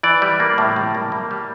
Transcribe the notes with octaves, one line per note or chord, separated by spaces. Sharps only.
E3 D5
G3
A#3
A2
G3
A#3
A#3
G3